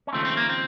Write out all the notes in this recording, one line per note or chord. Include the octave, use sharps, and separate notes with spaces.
C#4
D#2 C#3 F3 A3 C4
C4
A#3
C4